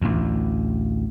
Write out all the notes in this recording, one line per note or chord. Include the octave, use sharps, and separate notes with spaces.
A1 D2